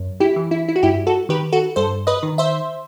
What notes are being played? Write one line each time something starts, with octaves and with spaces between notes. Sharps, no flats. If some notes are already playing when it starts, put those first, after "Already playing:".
Already playing: F#2
E4 G4
E3
E4
E4
F#4
G2 E4 G4
F#4 A4
D#3 G4 B4
F#4 A4
G2 A4 C5
B4 D#5
D#3
C5 E5